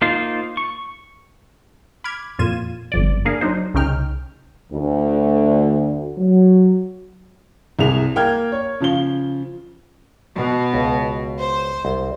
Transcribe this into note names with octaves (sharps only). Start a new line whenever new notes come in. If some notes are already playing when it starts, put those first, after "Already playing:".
A#3 D#4 F4 C5
C#6
B5 D6 F6 G#6
F2 A#2 F4 G#6 D#7 E7
G1 F2 D5
A#3 D4 G#4 A#4 F5
F#3 D4 D#4 C5
C2 C#3 C#4 D#4 G5 F6
D2
F#3
C2 C3 G#4 F7
A#3 G5 F6 G#6
C#5
C#3 F3 F5 G7
B2
C#2
C5
C2